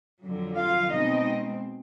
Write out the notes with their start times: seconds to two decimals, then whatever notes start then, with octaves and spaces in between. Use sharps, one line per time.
0.22 F2 D3 F#3
0.58 F4 F5
0.93 B2 G#3 C4 D#4 D#5